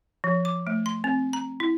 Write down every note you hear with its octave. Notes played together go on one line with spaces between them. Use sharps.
F3
D6
A3
C6
C4
A#5
E4